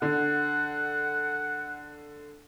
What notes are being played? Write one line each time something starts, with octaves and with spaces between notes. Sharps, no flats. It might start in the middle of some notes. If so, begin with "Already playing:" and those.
D3 F#5